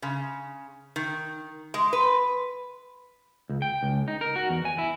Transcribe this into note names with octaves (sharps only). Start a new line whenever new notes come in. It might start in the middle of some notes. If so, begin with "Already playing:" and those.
C#3
D#3
G#3
B4
C#2
G5
C#2
D#4
A#4
F#4
E2
G#5
E4